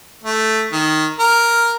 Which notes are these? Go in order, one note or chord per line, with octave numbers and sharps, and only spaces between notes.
A3
D#3
A#4